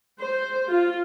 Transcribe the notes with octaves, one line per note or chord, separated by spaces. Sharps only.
C5
F4